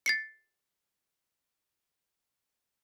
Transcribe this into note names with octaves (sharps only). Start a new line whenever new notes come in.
A6 C7 C#7